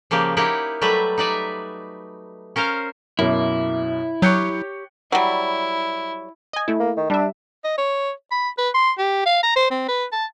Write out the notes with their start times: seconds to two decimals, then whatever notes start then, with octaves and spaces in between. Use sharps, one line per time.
0.11 C#3 F3 A#3 G4
0.37 A#3 D#4 E4 G4 F#5 G5
0.81 F#3 G3 A3 B4 E5
1.18 D#4 B4 D5 E5
2.56 C#4 A#4 C5 F5
3.19 F#2 B2 A#3 E4
4.22 F#3 G4 C#5 F#6 G6 C#7
5.12 F#3 G3 E4
6.53 D#5 G#5
6.68 A3 E4
6.80 A#3
6.97 D#3
7.10 G3 D4 E5
7.64 D#5
7.78 C#5
8.31 B5
8.58 B4
8.74 C6
8.99 G4
9.26 F5
9.43 A#5
9.56 C5
9.71 C4
9.88 B4
10.12 A5